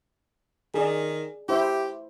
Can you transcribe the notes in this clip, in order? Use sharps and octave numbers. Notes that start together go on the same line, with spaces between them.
D#3 G#4 D5
E4 G4 C5 E5